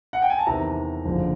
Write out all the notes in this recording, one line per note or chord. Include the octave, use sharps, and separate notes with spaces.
F#5
G5
G#5
A5
E2 C3 D#3 A#5
F#1 F2 D3 F3